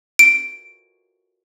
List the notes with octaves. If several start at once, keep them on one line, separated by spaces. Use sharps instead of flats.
D7